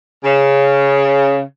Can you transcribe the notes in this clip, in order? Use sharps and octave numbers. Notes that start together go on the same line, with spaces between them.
C#3